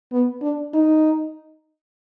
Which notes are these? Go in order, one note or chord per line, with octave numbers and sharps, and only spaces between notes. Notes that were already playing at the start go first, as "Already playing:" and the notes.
B3
D4
D#4